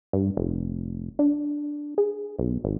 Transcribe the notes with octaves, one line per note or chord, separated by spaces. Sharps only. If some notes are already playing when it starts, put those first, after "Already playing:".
G2
F1
D4
G#4
B1
G#1